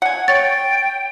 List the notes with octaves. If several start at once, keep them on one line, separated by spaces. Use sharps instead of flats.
F#5 G#5
C#5 G5 A6